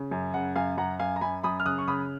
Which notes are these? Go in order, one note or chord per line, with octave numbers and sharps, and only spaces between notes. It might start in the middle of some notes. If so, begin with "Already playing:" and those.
Already playing: C#3
F#2
C#3 F#5
F#2 F5 G#5
F#2 F#5 A#5
F#2 F5 G#5
A#5
F#2 G#5 B5
F#2 B5 D#6
F6
C#3 D#6 F#6
C#6
C#3 B5 D#6